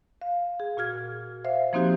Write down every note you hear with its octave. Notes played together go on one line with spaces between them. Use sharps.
F5
G#4
A#2 F#4 F6 G#6
C5 E5 F5
F3 A#3 C4 D#4 F#4 G4